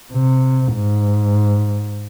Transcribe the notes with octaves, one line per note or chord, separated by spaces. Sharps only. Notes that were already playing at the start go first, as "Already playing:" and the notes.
C3
G#2